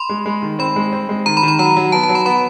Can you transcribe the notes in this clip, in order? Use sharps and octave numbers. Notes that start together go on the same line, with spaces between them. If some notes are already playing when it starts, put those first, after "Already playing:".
Already playing: B5 C6
G#3
G#3
D#3
C4 B5
G#3
C4
G#3
D#3 A#5
B5
D#3
B5
F#3 A#5
F#3
B3 A5
A5
F#3
B5
B3 B5